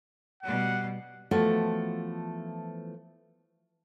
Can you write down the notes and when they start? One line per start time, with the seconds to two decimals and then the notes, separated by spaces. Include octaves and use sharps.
0.43 B2 G3 F#5
1.31 E3 F3 A3 B3 F4 F#4